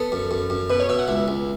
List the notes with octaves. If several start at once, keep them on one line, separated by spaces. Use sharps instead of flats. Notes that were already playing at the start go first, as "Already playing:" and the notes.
Already playing: B3 A4
F#2
F#2
F#2
B2 B4
C#5
B2 E5
F#5
C#2 E5
C#2